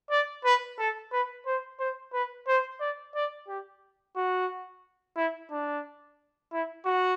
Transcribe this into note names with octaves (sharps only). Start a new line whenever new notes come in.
D5
B4
A4
B4
C5
C5
B4
C5
D5
D5
G4
F#4
E4
D4
E4
F#4